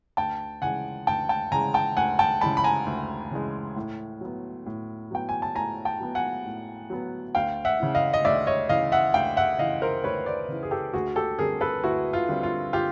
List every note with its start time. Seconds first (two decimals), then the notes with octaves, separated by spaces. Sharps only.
0.17 D2 G5 A5
0.62 C#3 E3 G#3 F#5 G#5
1.07 D2 G5 A5
1.29 G5 A5
1.52 C#3 E3 G#3 G#5 A#5
1.74 G5 A5
1.97 D2 F#5 G#5
2.19 G5 A5
2.41 C#3 E3 G#3 A5 B5
2.57 B5
2.64 G#5 A#5
2.86 D2
3.31 C#3 E3 G#3
3.76 A2
4.21 F#3 B3
4.66 A2
5.11 F#3 B3 G5
5.29 G#5
5.42 A5
5.55 A2 G#5 A#5
5.85 G5 A5
6.00 F#3 B3
6.15 F#5 G#5
6.45 A2
6.90 F#3 B3
7.35 D2 F5 G5
7.65 E5 F#5
7.80 C#3 E3
7.95 D#5 F5
8.14 D#5
8.25 D2 D5 E5
8.47 C#5 D#5
8.69 C#3 E3 D#5 F5
8.92 E5 F#5
9.14 D2 F5 G5
9.37 E5 F#5
9.59 C#3 E3 D#5 F5
9.82 A#4 C5
10.04 D2 B4 C#5
10.26 C5 D5
10.49 C#3 E3
10.63 G#4
10.71 G4 A4
10.94 D2 F#4 G#4
11.16 G4 A4
11.39 D3 G3 C4 G#4 A#4
11.61 A4 B4
11.83 D2 E4 F#4
12.13 F4
12.28 D3 G3 C4
12.43 F4
12.73 F4 G4